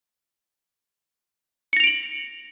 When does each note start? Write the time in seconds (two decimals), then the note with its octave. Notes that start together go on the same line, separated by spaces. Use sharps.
1.73 C#7
1.77 A#6
1.80 F7
1.84 D7
1.87 F#7